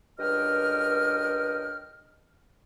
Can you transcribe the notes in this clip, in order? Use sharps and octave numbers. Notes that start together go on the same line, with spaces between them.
C#2 G2 A#4 D#5 G5 F6